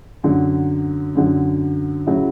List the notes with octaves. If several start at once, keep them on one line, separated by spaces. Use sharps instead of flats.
F#2 D3 F#3
F#2 D3 F#3
C#3 F#3 C#4 E4